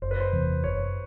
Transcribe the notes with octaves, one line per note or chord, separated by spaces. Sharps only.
F#1 C5
B4
C5
E2 C3 E3
F#1 C#5